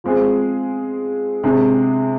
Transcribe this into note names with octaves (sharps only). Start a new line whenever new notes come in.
F3 G#3 C4 G#4
C3 G#3 D4 G#4